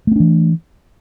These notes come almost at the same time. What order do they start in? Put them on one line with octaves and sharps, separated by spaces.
A3 C4 D4 E3